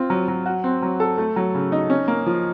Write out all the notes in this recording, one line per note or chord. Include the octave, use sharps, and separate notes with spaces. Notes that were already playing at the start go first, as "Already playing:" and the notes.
Already playing: C4 F4
F#3
F#3
F#4
C4
F#3
A4
A3
F#3
C#3
D#4
C#4
A#3
F3